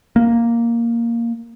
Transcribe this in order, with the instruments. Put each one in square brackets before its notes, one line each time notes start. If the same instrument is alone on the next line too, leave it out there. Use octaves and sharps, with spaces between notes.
[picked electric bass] A#3